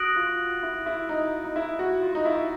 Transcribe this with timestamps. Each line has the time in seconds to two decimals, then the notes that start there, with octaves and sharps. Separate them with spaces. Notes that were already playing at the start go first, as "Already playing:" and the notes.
Already playing: F#4 D#6 F#6 A#6 D7 F#7
0.16 F4
0.63 E4
0.86 E4
1.09 D#4
1.44 D#4
1.56 E4
1.79 F#4
2.02 F4
2.15 D#4
2.25 E4